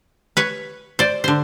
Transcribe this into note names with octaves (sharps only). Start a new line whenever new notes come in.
B4 C#5
C5 D5
D3 C5